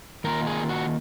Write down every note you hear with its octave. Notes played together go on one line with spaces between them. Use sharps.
D#3 A#3 F4 A#4
G#4
F#4